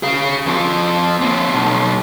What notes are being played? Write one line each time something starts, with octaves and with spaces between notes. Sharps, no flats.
G#4 F5
F3 C4
A#3 C4
B1